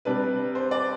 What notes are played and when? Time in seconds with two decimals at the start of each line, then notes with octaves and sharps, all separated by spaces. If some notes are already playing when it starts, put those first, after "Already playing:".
0.05 C3 G3 D4 B4
0.55 C5
0.71 D5